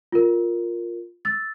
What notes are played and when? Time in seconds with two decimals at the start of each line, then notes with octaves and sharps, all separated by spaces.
0.12 F4 A#4
1.25 E6 A6